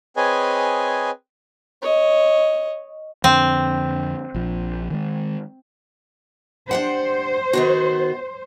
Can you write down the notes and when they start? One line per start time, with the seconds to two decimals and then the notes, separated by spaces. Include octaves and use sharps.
0.16 C4 G#4 B4 C#5 D#5 G#5
1.82 C#5 D#5
3.24 F2 D3 C4
4.35 A#1 F3
4.90 D#3 G#3
6.71 D4 G4 C5 F#5
7.53 D#3 B3 F#4